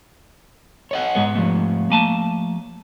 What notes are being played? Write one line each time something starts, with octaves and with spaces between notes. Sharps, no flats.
C#5 D#5 F#5
G#2 G#3 B3
F3 A3
A#3 G#5 A5